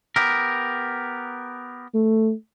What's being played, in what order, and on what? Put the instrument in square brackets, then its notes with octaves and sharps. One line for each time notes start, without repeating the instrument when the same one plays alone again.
[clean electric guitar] B3 G4 A#4
[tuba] A3